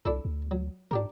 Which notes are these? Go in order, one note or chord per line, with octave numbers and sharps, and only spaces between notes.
C2 D4 E4 A4
D2
F#3
G#2 D4 G4 A#4